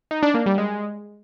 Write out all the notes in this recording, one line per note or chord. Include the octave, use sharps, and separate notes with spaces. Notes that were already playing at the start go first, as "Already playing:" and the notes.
D#4
D4
A#3
G3
G#3